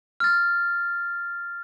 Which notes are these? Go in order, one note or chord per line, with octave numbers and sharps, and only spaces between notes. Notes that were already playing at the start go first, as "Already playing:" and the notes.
F6 A6